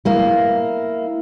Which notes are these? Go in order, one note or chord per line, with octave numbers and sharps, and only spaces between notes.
A#3 E4